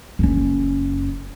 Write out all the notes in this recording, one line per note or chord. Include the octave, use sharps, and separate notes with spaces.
F#1 C#4